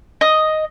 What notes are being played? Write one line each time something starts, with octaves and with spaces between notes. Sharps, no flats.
D#5